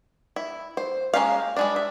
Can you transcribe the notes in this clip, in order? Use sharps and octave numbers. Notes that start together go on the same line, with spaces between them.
E4
C5
G#3 A#3 C#4 G4 F5
G3 G#3 D4
E5